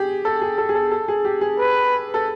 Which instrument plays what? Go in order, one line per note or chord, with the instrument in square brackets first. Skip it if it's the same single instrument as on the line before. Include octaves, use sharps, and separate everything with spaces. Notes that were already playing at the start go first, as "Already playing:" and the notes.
Already playing: [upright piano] G4 G#4
A4
G#4
A4
G#4
A4
A4
G#4
G4
G#4
[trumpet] B4
[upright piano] A4